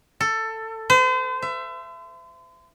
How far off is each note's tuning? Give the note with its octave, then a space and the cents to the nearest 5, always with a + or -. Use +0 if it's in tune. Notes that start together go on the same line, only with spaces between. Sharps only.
A4 +15
C5 -40
E5 +25